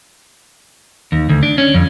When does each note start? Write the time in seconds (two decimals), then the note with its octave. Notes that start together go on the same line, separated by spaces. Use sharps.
1.12 D#2
1.29 D2
1.43 D4
1.58 C#4
1.74 F2